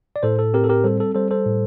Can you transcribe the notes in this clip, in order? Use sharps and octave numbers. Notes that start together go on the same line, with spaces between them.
D5
A2 A4 C5
A4
C4 G4 A#4
A4
G4 A#4
G3 A4 C5
A4
G3 A4 C5
A4 C5
A2